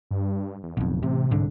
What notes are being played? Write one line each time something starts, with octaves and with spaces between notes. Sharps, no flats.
G2
E2
D1 B1 F2
A1 C3
C2 G#2 D3